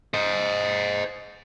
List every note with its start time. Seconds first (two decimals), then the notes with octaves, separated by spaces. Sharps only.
0.14 C5 D#5